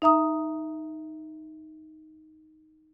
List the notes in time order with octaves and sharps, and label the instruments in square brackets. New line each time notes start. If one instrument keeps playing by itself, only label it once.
[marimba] D#4 E5 A#5 D#6